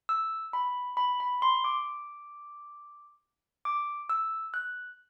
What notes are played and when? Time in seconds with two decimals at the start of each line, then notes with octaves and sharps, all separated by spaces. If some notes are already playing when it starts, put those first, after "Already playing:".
0.09 E6
0.53 B5
0.97 B5
1.20 B5
1.42 C6
1.64 D6
3.65 D6
4.09 E6
4.54 F#6